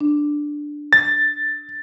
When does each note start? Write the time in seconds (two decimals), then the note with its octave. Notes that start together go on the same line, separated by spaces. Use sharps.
0.01 D4
0.93 A6